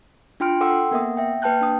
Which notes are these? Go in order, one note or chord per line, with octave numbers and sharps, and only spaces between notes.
D4 F4 G5 C6 F6 D7
A4 F#5 G5 C6 D6 E6
A#3 B3 A#4 E5 F#5 D#6
E5 G5
A#3 B4 G5 A5 F#6 G6
D4 D#6